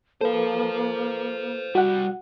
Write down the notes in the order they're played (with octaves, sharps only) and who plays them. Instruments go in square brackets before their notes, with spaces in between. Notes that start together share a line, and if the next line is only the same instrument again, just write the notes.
[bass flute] A#3 [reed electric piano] A4 B4 [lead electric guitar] C5 F5
[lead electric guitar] C2 G3 [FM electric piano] F#4 F#5